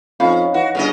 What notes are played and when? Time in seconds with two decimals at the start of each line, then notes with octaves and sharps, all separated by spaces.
0.20 F2 C#4 D#4 F5 B5
0.54 E3 F#4
0.75 G1 C#3 C#4 D#5